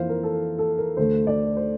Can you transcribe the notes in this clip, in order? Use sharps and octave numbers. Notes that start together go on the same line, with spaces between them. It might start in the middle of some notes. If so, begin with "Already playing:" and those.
Already playing: F2 E3 A#3 C5 F5
A#4
A4
A4
A#4
D2 D3 A3 C5
D5
C5